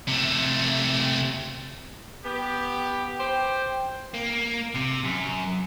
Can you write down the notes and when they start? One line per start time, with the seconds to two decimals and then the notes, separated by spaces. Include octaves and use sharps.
0.08 C3 A3
2.24 B3 G4
3.19 G4 C5 G5
4.14 A#3
4.75 C3
5.05 F#2